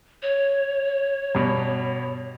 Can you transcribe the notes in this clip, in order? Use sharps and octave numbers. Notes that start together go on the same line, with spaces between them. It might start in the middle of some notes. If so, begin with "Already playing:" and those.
C#5
G2 B2